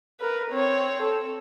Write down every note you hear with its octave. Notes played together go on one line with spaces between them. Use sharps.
A#4 B4
C4 C#5
A4